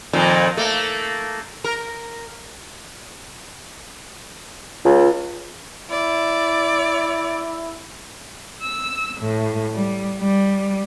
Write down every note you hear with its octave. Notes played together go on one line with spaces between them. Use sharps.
F2 A#2 D#3
A3 A#3
A#4
C#2 F4
E4 D5
E6
A2
G3
G3